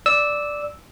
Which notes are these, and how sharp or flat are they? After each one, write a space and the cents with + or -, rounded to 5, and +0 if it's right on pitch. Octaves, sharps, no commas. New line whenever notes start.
D5 +0 E6 -15